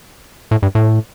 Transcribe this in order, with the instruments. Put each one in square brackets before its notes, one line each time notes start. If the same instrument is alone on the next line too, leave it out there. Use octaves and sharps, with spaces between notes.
[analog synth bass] A2
G2
A2